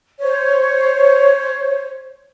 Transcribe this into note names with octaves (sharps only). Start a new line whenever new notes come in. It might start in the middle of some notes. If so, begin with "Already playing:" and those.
C5 C#5